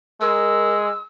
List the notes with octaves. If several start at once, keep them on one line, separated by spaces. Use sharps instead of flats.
G#3 A#4 E6